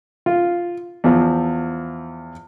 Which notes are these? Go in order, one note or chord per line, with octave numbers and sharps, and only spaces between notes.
F4
E2 F3